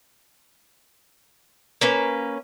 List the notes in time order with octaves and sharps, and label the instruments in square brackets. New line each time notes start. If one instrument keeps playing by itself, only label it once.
[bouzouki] A#3 C#4 B4